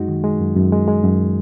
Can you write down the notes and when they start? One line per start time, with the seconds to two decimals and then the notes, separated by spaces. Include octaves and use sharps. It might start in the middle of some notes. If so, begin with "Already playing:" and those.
Already playing: F#2 G#3 D#4 F#4
0.08 D#3
0.24 G#3
0.40 F#2
0.56 F#2
0.72 G#3
0.88 G#3
1.03 F#2